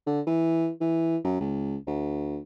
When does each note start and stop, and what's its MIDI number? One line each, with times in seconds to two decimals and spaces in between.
0.06 0.21 50
0.26 0.70 52
0.81 1.17 52
1.24 1.39 42
1.40 1.76 37
1.87 2.38 38